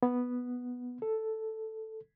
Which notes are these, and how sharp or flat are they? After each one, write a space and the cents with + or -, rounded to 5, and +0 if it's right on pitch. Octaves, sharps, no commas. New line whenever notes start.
B3 +0
A4 +0